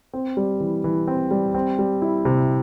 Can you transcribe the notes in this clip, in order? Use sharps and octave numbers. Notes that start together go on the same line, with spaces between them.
C4
G3
E3
E3
C4
G3
C4
G3
E4
C3